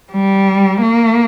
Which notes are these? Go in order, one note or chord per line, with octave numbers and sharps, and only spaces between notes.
G3
A#3